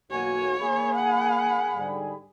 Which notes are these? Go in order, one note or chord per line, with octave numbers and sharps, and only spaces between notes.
B1 A#3 F#4 C#5 G#5
A#3 G#4 B5
F#5
G#2 D3 G3